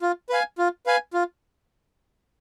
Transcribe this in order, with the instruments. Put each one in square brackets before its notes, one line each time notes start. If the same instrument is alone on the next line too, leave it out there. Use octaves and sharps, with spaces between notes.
[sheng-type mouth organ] F4
B4 F5 G#5
F4
B4 F5 G#5
F4